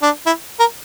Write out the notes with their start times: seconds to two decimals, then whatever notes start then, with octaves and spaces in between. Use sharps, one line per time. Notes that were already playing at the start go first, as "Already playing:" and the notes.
0.02 D4
0.26 E4
0.60 A#4